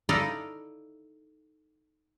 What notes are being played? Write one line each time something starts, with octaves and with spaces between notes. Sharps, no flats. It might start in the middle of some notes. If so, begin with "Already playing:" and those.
D#4 E4 A4 D5 D#5 F5